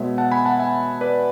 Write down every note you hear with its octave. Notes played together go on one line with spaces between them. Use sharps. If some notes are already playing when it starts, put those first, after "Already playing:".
Already playing: B2 G#3 B3 C#5 E5
F#5 A5
G#5 B5
F#5 A5
E5 G#5
B4 D5